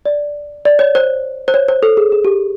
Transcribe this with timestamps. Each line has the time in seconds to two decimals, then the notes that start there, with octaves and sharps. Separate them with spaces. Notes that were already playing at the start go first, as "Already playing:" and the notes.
0.06 D5
0.65 D5
0.79 C#5
0.95 C5
1.48 C5
1.54 C#5
1.68 C5
1.83 A4
1.97 G#4
2.12 G#4
2.25 G4